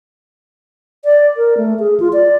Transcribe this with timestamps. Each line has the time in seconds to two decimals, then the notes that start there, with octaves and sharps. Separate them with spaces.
1.05 D5
1.37 A#4
1.58 A3
1.79 G#4
2.00 F4
2.13 D5